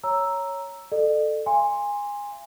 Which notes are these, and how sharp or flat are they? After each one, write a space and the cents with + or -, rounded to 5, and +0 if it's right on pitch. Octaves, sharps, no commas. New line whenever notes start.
C#5 +0 A#5 +0 E6 +0
A4 +0 D5 +45
F5 -30 G#5 -20 C6 +5